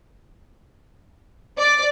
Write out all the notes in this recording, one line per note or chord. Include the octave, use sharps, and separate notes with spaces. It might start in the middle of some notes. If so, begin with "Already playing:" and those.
D5